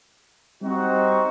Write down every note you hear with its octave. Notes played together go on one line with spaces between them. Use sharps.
G3 C4 D#4 F#4